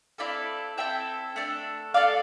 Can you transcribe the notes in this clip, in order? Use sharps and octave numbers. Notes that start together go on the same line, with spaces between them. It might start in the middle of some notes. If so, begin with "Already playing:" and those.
C4 E4 A4 D5 F5
C4 E4 A4 E5 G5
A3 D4 A4
A3 D4 A4 D5 F5